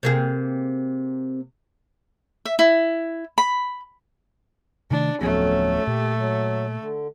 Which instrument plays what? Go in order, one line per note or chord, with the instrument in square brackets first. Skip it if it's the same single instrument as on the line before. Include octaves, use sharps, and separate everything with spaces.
[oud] C3 A#3 G#4
[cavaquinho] E5
E4
B5
[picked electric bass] C3 D#3 A3 [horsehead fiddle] D4
[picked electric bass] D1 F3 B3 [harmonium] F2 F#3 C#4 [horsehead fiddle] A3
[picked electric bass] A#2 [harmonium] G4
[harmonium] F#3
D3